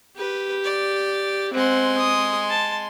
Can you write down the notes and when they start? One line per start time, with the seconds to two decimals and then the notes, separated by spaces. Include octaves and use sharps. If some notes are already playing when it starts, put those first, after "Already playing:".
0.17 G4 B4
0.64 D5
1.53 G#3 C4 F#5 C6
1.98 D#6
2.50 A5